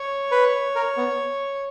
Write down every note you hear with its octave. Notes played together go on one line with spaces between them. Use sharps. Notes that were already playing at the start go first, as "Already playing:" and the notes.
Already playing: C#5
B4
A#4
B3